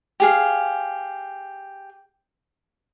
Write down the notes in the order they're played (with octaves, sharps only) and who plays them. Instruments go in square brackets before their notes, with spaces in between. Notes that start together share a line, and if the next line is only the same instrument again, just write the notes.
[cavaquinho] G4 G#4 F5